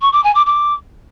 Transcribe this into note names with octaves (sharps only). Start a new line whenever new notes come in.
C#6
D6
G#5
D6
D6